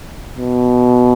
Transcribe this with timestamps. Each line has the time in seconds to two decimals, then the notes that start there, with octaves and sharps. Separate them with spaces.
0.38 B2